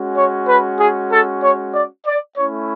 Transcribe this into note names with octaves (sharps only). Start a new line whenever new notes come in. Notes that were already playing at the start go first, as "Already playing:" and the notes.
Already playing: G#3 C#4 F#4
C#5
B4
G#4
A4
C#5
D5
D5
A3 C#4 E4 C#5